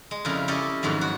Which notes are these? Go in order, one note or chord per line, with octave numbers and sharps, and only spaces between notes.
G#3
F2 C#3 G3 E4 A#4
C#4 E4 G4 A4 D5 D#5
F2 G#2 D#3 F#3
F#4